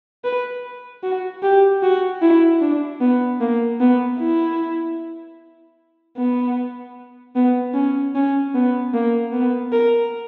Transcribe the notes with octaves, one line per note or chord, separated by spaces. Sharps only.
B4
F#4
G4
F#4
E4
D4
B3
A#3
B3
E4
B3
B3
C#4
C#4
B3
A#3
B3
A#4